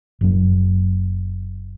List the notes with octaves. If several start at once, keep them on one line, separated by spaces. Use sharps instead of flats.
F#1 F#2 F#3